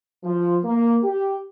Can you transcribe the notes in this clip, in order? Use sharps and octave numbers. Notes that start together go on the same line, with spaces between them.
F3
A#3
G4